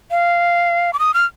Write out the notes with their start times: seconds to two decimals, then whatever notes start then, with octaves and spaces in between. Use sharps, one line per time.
0.11 F5
0.93 D6
0.99 D#6
1.14 F6